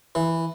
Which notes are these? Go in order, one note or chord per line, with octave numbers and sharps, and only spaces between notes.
E3